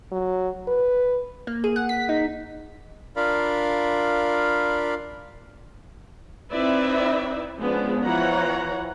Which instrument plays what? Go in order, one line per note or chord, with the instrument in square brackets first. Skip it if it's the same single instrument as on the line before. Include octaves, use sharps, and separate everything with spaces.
[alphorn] F#3
B4
[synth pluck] A#3
G#4
F#5
B6
D#4
[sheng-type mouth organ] D4 F4 A#4 D5 F5 B5
[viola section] C4 D#4 E4 B4 D5 E5
F3 G#3 B3 C#4 D4
E3 F3 C#5 F#5 A#5